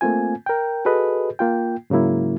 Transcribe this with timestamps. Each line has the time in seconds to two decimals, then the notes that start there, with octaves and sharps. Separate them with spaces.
0.01 A3 A#3 C4 F4 G#5
0.46 A#4 G5
0.85 F#4 G#4 A4 B4 D#5
1.39 A#3 F4 G5
1.90 G#2 C#3 F#3 A#3 E4